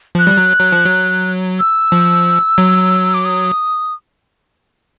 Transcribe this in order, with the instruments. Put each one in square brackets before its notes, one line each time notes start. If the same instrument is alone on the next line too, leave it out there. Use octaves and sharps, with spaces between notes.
[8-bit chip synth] F3 [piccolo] F#6
[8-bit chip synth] G3
F#3
F#3
F3
F#3
[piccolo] E6
[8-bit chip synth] F3
F#3
[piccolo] D6
D#6